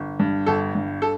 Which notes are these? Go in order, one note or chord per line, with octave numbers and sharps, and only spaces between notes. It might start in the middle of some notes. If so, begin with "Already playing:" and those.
Already playing: G1
G2
G1 A4
G2
A4